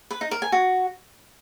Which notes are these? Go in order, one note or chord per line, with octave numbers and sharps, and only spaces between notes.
B4
D#4
A#4
G#5
F#4